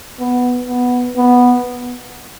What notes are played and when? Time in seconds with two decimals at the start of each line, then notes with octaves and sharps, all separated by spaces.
0.20 B3
0.68 B3
1.17 B3